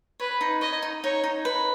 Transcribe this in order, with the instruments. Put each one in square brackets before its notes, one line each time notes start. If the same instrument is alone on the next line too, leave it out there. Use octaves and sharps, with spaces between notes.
[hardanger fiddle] B4 [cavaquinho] C#5
[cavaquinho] D#4
[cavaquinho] C#5 [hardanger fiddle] D#5
[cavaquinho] D#4
[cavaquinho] D#4 [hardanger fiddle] C#5
[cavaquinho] D#4
B4